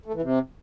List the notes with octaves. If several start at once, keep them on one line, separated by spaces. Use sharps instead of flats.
A3
E3
C3